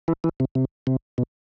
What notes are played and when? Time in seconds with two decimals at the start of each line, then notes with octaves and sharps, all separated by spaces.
0.08 E3
0.24 E3
0.40 C3
0.55 C3
0.87 C3
1.18 B2